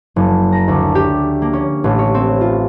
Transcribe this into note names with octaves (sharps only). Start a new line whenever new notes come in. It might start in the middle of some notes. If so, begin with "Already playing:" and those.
F#1
A#5
D2
G4
A#3
C#4
A1
C#5
C4
F4